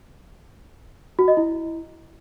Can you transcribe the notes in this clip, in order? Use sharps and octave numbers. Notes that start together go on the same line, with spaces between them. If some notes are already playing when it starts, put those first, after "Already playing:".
F#4
D#5
E4